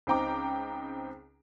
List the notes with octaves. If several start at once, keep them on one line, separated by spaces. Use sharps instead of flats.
C#2 C4 D#4 G5 A#5 D6